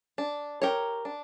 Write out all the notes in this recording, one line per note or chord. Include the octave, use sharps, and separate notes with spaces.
D4
G4 A#4 C#5
D4